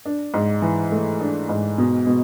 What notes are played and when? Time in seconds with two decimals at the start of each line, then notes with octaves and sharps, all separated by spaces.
0.06 D4
0.34 G#2
0.62 E3
0.92 A3
1.21 D4
1.49 G#2
1.78 B2
2.07 B2